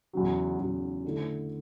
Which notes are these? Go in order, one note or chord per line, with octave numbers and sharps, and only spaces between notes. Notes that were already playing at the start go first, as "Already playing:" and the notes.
E2 C#3 F#3
E2 C#3 F#3
D3 A3 E4